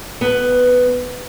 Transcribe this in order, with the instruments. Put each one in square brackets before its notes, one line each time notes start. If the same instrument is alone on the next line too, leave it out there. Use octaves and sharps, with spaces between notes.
[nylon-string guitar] B3